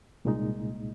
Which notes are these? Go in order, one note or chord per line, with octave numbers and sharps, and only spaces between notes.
C2 A#2 G#3 D#4